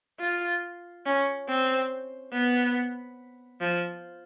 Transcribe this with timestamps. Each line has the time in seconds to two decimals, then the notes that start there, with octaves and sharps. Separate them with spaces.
0.20 F4
1.06 C#4
1.48 C4
2.33 B3
3.61 F3